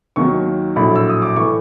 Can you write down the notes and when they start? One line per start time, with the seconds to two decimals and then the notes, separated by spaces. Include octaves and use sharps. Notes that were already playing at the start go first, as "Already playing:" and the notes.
0.16 D#2 D#3 F#3 A#3 C#6
0.76 A#1 A2 F#3 B5
0.96 E6
1.09 D#6
1.22 D6
1.36 A2 E3 C#6